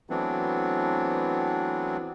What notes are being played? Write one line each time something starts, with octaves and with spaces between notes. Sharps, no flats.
E3 F#3 A3 B3 C4 D4